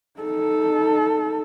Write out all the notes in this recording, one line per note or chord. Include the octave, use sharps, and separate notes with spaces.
D#4 A4